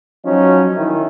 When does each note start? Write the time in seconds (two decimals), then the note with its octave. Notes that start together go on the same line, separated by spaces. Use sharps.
0.24 F3 F#3 C#4 D#4
0.76 D#3 E4